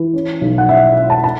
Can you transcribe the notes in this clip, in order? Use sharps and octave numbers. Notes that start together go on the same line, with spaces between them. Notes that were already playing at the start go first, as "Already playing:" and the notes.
Already playing: E3
C#4
B1
F#5
C#4 E5
C#4
A5
A5